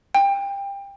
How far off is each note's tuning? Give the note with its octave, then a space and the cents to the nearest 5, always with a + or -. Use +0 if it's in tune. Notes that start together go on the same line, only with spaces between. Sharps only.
G5 +25